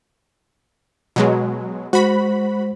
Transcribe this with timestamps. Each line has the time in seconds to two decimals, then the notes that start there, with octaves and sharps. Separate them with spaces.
1.16 B2 F#3 G#3
1.93 G#3 F#4 C5 B5